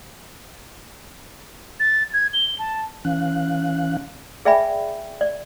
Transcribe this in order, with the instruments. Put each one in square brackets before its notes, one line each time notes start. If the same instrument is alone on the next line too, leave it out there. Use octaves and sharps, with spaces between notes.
[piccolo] A6
G#6
G7
A5
[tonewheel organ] E3 C#4 F5 F#6
[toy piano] G#4 D5 E5 G5 G#5 B5
D5